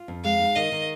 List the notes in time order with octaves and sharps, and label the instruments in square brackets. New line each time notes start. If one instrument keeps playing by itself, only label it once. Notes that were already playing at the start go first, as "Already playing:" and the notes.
Already playing: [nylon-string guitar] F4
F2
[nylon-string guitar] G#3 [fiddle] F5
[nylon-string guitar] D#4
[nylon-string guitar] D#3 [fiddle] D#5
[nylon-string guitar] D#3